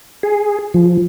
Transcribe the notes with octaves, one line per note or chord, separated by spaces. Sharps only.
G#4
F3